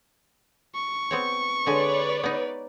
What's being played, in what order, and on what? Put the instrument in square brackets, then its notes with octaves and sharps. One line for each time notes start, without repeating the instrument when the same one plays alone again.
[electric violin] C#6
[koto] B3 C4 C#5
[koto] D3 G#3 G#5 [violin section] B4 C#5 D5
[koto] B3 D#4